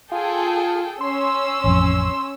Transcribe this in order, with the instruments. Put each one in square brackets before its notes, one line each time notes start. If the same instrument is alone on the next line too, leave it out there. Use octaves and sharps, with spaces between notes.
[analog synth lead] F4 [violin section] G#4 A4 G5
[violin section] C#4 E6 [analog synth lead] C6
[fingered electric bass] A1 F2